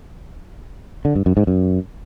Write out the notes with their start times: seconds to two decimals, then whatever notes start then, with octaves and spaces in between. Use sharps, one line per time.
1.05 D3
1.15 G2
1.26 F#2
1.37 G#2
1.47 F#2